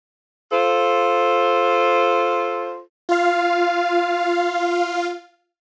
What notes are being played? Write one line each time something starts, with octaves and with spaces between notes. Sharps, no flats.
F4 A4 C5
F4 F5